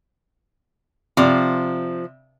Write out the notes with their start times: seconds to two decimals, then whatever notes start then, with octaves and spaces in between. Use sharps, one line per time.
1.17 C3 F3 D5